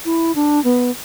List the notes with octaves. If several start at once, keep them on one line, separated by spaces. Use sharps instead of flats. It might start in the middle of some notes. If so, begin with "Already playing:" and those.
E4
D4
B3